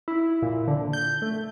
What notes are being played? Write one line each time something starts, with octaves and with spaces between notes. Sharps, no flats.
E4
A#2
D3
G6
A3